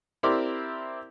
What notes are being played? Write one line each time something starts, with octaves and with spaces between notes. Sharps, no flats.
C4 E4 G4 A#4 D5 C6